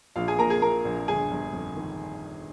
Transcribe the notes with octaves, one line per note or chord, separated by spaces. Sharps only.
A#1 F4 F5
G#4 G#5
A#2 A#4 A#5
G#4 G#5
A#2 A#4 A#5
A#1
G1 G#4 G#5
G1
F2
D#3